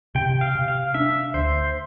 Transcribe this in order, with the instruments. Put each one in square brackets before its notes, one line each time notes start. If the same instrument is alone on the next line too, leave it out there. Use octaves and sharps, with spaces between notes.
[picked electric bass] C3 [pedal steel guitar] G5
[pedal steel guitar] F5
[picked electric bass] C3
[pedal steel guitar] F5
[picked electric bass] D4 [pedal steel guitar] E5
[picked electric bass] D2 [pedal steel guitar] C5